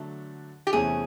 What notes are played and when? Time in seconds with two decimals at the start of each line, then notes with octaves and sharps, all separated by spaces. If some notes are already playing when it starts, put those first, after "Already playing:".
Already playing: D3 F#3 A3 D4
0.67 G4
0.73 E2 C3 E3 A3 C#4 G#4